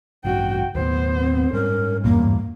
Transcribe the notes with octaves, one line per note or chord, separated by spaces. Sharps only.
A1 G2 C#3 F#4 G5
D#2 A2 B3 C5
C4
G#2 G3 G#3 C#4 A#4
E2 G2 A#2 A#3